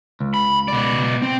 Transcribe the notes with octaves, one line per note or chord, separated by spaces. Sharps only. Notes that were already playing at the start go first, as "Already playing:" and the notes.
C#2
B5
B2 D5
C4